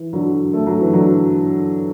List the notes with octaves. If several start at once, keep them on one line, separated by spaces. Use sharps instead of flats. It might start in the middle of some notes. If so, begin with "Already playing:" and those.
Already playing: E3
D3 F#3
A3
F#3
E3
D3 F#3